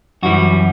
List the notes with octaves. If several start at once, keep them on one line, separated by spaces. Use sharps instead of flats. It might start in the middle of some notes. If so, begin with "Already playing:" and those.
F#2 E3 G3 F#4